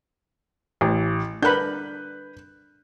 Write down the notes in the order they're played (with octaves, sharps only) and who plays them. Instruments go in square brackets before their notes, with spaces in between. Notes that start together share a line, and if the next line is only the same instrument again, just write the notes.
[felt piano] A1
[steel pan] D4 A#4 B5 [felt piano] B4 F#6 G6